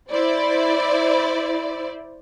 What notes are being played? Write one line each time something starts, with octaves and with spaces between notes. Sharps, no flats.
E4 C5 D5